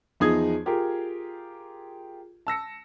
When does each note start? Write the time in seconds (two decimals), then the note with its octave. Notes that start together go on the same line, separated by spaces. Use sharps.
0.20 E2 F3 D#4 G#4 D#6 G#6
0.66 F4 G4 G#4 A#4
2.47 A5 E6 A#6 C#7